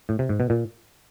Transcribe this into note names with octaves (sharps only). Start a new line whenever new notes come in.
A2
C3
G#2
B2
A#2